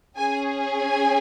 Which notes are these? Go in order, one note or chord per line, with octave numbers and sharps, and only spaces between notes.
C#4 G#4 G#5
G#5